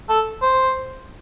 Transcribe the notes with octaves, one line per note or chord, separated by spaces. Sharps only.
A4
C5